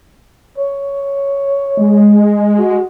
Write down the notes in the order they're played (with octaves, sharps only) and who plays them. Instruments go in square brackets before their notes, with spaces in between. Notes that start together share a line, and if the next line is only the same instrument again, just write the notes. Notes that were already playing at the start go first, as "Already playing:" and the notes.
[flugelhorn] C#5
[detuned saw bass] G#3
[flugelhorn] F#4